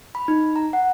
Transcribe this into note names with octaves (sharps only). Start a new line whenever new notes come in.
B5
D#4
A#5
F#5